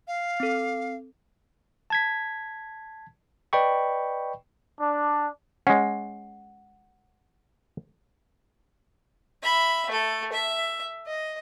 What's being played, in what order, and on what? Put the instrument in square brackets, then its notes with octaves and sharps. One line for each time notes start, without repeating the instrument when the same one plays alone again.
[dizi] F5
[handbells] C4 A4
[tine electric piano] A5 G#6 B6
B4 D5 D#5 G5 B5 C#6
[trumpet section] D4
[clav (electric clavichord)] G#3 C#4 [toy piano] F#5
[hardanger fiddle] E5 B5
A3 A4
E5
D#5